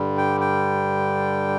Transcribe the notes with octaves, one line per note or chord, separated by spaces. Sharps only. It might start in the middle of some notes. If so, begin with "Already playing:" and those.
Already playing: G2 D3 G3
G5
G5